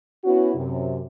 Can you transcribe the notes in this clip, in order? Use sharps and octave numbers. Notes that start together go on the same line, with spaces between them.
B3 C#4 E4 F#4
F#2 C3